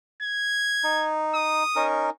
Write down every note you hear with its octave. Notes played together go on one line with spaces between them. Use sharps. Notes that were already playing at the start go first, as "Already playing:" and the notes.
G#6
D#4
D#6
C#4 D#4 A#4